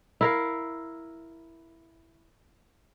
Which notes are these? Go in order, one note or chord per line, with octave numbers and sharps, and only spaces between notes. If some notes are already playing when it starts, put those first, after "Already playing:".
E4 A#4 F5